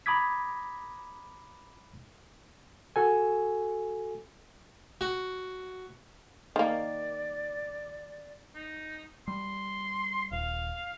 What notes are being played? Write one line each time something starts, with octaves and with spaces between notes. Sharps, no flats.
A#5 B5 D6 D#6 G#6 B6
F#4 A4 G#5
F#4
D#3 A#3 D5
D#4
G3 C6
D#1 F5